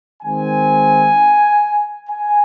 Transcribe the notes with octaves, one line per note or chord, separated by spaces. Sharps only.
D#3 G#3 C4 G#5
G#5